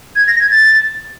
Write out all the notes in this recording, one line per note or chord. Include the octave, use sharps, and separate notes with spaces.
G#6
A#6
G#6
A6